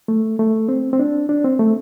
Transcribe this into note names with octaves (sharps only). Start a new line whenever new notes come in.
A3
A3
C4
C4
D4
D4
C4
A3